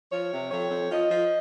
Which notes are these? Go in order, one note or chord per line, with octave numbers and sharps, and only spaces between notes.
F3 C#5
C3
F2 C#5
F2
F3 D#5
F3